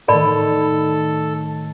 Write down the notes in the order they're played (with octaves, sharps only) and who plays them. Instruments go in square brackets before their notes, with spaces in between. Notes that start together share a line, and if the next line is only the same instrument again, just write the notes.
[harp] A2 D#3 [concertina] A4 [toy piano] A#4 D5 B5